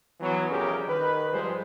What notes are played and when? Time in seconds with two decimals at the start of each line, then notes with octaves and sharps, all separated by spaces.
0.20 E3 F#3 B3
0.49 C2 F2 C#4 G4 G#4 A#4
0.87 D#3 B4
1.32 G#1 F3 G3 G#3 C5